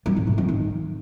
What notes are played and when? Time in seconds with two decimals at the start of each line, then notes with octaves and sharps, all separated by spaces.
0.06 G3
0.16 A2
0.27 A2
0.38 F3
0.48 D#3